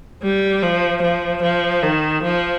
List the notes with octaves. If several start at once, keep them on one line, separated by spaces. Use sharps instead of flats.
G3
F3
F3
F3
D#3
F3